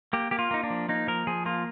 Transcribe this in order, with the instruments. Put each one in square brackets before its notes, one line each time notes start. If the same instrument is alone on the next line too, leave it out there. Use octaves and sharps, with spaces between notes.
[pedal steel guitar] A#3 G4
A#3 G4
F4
A#3 D#4
D4
F3
A#3 D#4
F3 A#4
F3 G#4
A#3 F4